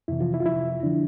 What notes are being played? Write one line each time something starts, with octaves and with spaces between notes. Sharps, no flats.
F2 C3 E3 E4
F3 F4
E4
F4
F2 C3 F3 E4
D3 F3 D4